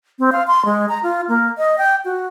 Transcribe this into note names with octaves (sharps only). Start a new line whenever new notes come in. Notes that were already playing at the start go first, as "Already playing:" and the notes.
C4
F5
C6
G#3
A#5
F4
A#3
D#5
G5
F#4